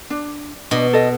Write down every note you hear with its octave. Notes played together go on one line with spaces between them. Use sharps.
D4
B2 D4 D#5
A4 D#5